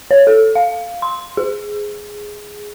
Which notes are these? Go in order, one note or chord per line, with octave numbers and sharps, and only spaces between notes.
C#5
A4
F5
C6
G#4